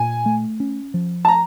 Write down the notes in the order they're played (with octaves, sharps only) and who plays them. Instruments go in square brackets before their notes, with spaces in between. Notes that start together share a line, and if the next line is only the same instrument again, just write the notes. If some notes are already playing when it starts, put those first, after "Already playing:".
Already playing: [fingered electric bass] A#2 [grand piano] G#5
[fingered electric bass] A3
C#4
F3
[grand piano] A5
A#5